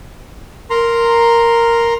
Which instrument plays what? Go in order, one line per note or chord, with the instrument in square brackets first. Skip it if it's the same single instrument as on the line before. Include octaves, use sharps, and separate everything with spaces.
[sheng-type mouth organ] A#4 A#5 C6